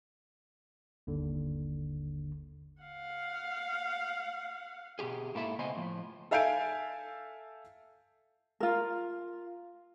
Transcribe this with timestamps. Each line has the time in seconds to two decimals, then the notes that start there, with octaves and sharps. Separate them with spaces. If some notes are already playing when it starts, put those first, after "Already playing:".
1.07 G1 D#2 D3
2.82 F5 F#5
4.99 B2 G3 G4 G#4
5.35 G#2 A#3 E4 A4 E5
5.59 C#3 A#3 B3 C5 D#5 G#5
5.75 A2 F3
6.31 A4 E5 F5 G#5 G6 D7
8.60 F4 A#4